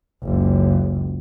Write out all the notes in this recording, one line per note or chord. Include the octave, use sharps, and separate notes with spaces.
F#1 C#2